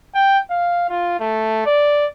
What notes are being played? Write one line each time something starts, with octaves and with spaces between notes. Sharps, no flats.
G5
F5
F4
A3
D5